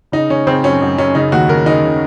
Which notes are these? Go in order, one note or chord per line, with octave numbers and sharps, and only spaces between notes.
C#3 D#4
C#3 C#4
C#3 C4
F#2 C#4
F#2
F#2 C#4
C#3 D#4
D#2 F#4
C#3 A#4
C#3 D#4
C#3